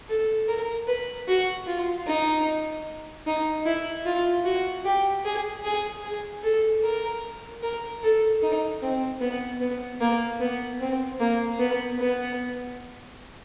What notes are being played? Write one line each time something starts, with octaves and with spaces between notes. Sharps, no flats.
A4
A#4
B4
F#4
F4
D#4
D#4
E4
F4
F#4
G4
G#4
G#4
G#4
A4
A#4
A#4
A4
D#4
C4
B3
B3
A#3
B3
C4
A#3
B3
B3